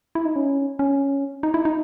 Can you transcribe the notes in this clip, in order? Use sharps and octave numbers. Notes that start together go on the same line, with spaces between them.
E4
D#4
C#4
C#4
D#4
E4
D#4